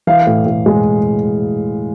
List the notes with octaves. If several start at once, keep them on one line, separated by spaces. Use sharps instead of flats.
E3 F5
A2
A2
G#3